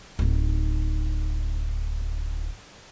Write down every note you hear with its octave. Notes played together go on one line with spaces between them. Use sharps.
D1 D#4